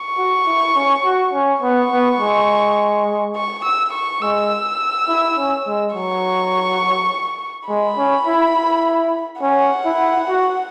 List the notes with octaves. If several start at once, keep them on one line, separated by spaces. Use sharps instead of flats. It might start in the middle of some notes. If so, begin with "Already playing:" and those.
Already playing: C#6
F#4
E4
C#4
F#4
C#4
B3 C#6
B3
G#3
C#6
E6
C#6
G#3 E6
E4
C#4
G#3
F#3 C#6
G#3 B5
C#4
E4
E4
C#4 F#5
E4
F#4